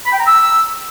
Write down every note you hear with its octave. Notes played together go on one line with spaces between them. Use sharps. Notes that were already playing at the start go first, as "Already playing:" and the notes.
B5
G5
A#5
E6